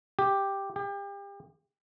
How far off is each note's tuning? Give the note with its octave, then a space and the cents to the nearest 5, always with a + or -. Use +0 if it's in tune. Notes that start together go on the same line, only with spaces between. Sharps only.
G4 +5
G4 +35